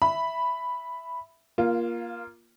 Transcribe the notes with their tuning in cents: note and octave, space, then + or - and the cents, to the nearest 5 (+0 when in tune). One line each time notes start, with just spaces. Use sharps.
E5 +0 B5 +0
A#3 +15 F4 -10